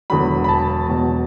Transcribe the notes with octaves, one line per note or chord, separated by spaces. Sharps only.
E1 E2 D3 F#3 B5
B5
A5
E1 E2 B2 F#3